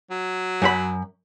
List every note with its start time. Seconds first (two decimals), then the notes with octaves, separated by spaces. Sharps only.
0.11 F#3
0.62 F#2 F#4 B5